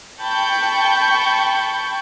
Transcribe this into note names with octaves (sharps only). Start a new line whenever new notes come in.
G5 A5 B5 C#6 G6